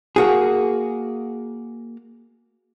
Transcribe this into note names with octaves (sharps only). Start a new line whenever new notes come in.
A#3 F#4 G#4